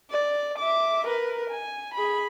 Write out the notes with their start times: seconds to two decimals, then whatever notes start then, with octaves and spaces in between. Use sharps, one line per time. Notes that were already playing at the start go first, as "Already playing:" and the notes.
0.10 D5
0.59 E5 D6
1.06 A#4 B4
1.50 G#5
1.94 G#4 B5